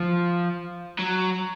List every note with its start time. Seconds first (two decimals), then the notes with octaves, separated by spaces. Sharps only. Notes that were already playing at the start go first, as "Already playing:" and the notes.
Already playing: F3
0.99 F#3